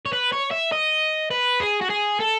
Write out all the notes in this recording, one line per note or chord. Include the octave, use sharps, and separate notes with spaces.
C#5
B4
C#5
E5
D#5
B4
G#4
F#4
G#4
A4